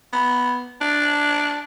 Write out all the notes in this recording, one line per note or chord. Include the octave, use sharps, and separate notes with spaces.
B3
D4